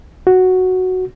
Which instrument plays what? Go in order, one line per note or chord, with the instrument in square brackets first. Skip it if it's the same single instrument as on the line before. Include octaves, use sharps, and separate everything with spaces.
[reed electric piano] F#4